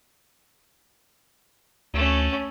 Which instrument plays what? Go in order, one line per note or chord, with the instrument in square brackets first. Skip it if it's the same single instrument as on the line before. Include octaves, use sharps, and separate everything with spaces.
[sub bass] D2 [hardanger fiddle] A3 C#4